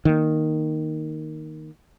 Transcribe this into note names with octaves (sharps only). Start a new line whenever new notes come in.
D#3 A#3